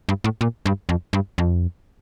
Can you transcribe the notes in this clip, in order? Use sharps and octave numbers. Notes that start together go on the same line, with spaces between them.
G2
A2
A#2
G2
F2
G2
F2